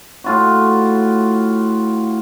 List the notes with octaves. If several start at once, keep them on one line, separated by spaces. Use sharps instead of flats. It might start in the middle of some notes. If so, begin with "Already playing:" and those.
A2 F4 F#4